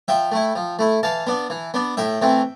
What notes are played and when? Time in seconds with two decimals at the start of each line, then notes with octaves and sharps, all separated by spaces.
0.08 F3 E5 G5
0.32 A3 E4
0.55 F3
0.79 A3 E4
1.03 E3 F5 A5
1.27 B3 D4
1.50 E3
1.74 B3 D4
1.97 A2 E5 G5
2.22 E3 A3 C4